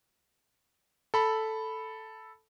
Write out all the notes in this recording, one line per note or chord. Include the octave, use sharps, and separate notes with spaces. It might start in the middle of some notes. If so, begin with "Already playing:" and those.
A4 B5